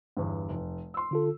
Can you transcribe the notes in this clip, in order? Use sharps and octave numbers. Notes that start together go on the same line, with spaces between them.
G1 E2 G2
F1
C6 E6
D3 F4 A4